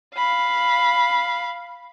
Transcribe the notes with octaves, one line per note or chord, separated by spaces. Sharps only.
F5 B5